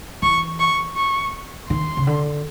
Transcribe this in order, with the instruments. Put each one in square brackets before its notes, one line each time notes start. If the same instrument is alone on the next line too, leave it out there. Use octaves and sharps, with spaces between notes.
[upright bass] E3 [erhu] C#6
[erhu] C#6
C#6
[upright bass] D#3 [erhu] C6
[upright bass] C#3
D3